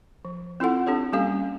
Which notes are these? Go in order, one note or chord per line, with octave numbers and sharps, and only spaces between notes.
F3
C4 E4 F4 A4 F#5
C4 D4 G4 A4 C#5
G3 A#3 C#4 G4 A4 F5